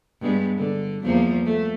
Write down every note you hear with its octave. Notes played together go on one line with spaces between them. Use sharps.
G2 G#3 B3
D3
E2 F3 A#3
A3